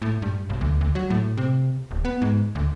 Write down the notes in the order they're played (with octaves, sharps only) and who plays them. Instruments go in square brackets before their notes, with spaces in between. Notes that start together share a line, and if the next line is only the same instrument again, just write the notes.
[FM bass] A2
G2
B1
D2
D2
F#3
A2
C3
D1
B3
G#2
D2